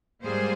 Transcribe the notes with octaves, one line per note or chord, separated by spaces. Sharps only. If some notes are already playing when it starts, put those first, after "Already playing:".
G#2 G3 A#3 G#4 C5